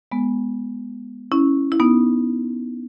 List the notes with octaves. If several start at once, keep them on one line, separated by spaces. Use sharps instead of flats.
G#3 B3
C#4 E4
E4
B3 D#4